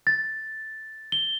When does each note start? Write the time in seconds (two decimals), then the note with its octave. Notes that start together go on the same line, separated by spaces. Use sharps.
0.07 A6
1.12 G7